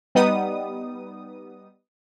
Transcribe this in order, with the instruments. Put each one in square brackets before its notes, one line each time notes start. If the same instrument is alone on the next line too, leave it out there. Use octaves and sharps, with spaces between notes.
[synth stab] G3 B3 D#4 D#6